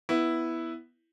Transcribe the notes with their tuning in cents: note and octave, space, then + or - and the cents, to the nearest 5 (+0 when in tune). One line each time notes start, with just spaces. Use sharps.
B3 +0 E4 +0